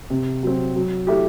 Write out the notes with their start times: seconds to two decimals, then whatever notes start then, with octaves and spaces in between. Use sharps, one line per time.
0.10 C3
0.43 F#3 C4
0.76 F#3
1.07 A3 E4 G4